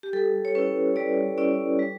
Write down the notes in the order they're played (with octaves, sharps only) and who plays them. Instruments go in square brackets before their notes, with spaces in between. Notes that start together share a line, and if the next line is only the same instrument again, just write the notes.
[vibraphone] G4
G3 A4
C#5
C#4 E4 B4
G3 D5
C#4 E4 D5
G3